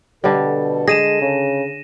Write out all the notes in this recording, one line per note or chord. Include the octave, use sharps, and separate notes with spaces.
B2 D3 G3 A4
G#3 G#4 A#6 D#7 E7
C#3